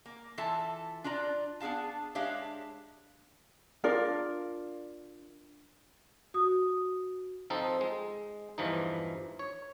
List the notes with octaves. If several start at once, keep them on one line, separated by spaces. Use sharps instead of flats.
A#3
E3 F4 A4 E5 A5
D4 F4 D5 A#5
B3 D4 G#4 F5 A5
G#3 D4 G4 C#5 E5 F5
D4 F4 A#4 D5
F#4 D#6
F3 C4 D#4 A4
G#3
E2 G2 E3 F3 D#4
C#5